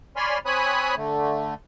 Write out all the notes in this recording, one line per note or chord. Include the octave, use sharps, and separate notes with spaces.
C#5 D5 G#5 B5 C6 F6
C4 C#5 G#5 B5 D#6 F#6
D3 A3